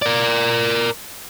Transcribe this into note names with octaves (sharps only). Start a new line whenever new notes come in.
A#4 D5